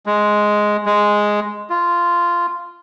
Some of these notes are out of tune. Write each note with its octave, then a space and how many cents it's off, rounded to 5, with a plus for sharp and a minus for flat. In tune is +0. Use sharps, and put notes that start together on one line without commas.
G#3 +5
G#3 +0
F4 -10